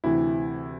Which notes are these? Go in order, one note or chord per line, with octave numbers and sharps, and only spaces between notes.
D2 C3 E3 E4